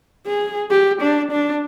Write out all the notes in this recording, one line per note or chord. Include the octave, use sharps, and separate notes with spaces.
G#4
G4
D4
D4